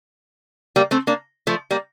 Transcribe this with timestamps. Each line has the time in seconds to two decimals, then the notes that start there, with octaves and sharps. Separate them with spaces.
0.76 G3 A#3
0.91 A3 C4
1.07 A#3 D4
1.47 F3 A3
1.71 G3 A#3